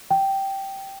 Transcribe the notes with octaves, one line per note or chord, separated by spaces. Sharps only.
G5